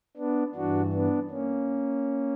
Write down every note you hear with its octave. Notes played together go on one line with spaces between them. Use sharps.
B3 D4
G2 E3 D4 F#4
B3 D4
A#3 C#4